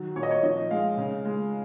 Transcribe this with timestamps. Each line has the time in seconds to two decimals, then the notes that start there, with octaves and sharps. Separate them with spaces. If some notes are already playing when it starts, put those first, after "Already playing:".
Already playing: D#3 F#3
0.16 A#2 C#5
0.23 D#5
0.31 C#5
0.43 F3 D#5
0.71 G#3 F5
0.97 C#3
1.25 G#3